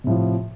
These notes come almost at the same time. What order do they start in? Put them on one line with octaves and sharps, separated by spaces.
C3 A2 F3